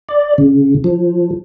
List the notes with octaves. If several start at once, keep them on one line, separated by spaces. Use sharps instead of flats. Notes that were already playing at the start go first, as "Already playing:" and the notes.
D5
C#3
F3